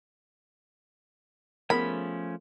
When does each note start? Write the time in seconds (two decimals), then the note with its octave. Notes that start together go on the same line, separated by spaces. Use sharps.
1.70 F3 A3 B3 C#4 G#4 A#4 B5